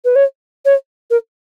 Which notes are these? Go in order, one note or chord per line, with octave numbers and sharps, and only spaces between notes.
B4
C#5
C#5
A#4